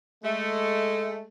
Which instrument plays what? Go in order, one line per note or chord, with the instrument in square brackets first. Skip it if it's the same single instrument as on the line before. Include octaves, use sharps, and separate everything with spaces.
[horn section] G#3 A3